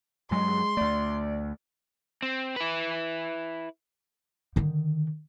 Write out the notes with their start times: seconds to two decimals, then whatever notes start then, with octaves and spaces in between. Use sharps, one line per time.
0.31 G2 F#3 G#3 C6
0.77 D2 A3 D5
2.22 C4
2.56 E4 B4
4.56 D3 D#3